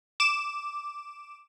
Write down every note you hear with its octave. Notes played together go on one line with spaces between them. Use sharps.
D6 E7